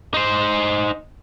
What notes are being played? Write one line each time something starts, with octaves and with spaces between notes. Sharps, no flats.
D#4 C5